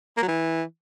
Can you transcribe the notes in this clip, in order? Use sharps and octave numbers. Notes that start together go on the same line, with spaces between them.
A#3
F#3
E3